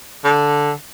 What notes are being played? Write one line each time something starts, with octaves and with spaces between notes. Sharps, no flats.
D3